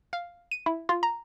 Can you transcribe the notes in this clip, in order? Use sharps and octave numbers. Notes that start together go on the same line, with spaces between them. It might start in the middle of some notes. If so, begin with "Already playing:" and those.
F5
D#7
E4
F4
A#5